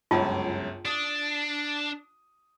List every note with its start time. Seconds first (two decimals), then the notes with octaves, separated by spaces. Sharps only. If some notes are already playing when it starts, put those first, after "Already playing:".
0.11 G1 C#2 F#2 F4 A5
0.85 D4 D#6